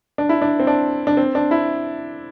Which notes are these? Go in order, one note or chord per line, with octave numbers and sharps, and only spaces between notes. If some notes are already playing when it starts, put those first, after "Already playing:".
D4
E4
D4
C4
D4
D4
C4
D4
E4